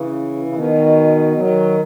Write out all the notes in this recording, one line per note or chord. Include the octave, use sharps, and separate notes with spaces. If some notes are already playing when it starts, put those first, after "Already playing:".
Already playing: C#3 E3
C#3
B2 D#3
D#3 F#3